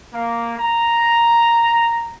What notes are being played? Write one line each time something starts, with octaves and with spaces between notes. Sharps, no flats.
A#3
A#5